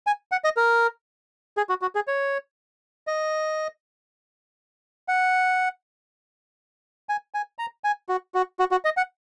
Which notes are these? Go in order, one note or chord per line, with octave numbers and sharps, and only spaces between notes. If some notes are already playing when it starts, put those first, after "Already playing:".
G#5
F#5
D#5
A#4
G#4
F#4
F#4
G#4
C#5
D#5
F#5
G#5
G#5
A#5
G#5
F#4
F#4
F#4
F#4
D#5
F#5